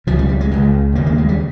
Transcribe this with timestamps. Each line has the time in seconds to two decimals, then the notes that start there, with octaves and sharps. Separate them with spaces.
0.07 C#2 C#3 F3
0.19 G3
0.29 G3
0.40 G#3
0.51 C#2 C#3 G#3
0.95 D#2 C#3 A#3
1.06 A#3
1.18 G#3
1.29 G3